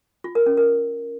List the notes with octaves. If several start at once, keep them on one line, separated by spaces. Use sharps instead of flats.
F4
A#4
C#4
A#4